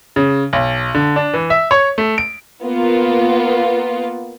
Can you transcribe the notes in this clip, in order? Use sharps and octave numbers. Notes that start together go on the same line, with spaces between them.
C#3
B1
D3
D4
E3
E5
C#5
A3
D7
A#3 B3 F4